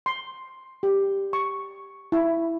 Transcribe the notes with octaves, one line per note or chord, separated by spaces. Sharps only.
C6
G4
C#6
E4